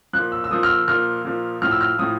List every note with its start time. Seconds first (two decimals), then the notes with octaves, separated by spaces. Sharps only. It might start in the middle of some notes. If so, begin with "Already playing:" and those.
0.13 F3 F#6
0.17 A#2
0.32 E6
0.44 E6
0.51 A#2 F3 D#6
0.63 F6
0.69 E6
0.88 A#2 F3 F6
1.25 A#2 F3
1.62 A2 F3 F6
1.71 E6
1.81 F6
1.99 A2 F3 D#6